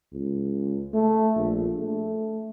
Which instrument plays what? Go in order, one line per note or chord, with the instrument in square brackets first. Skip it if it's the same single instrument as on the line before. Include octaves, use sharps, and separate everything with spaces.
[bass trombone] C#2
A3
A#1
A3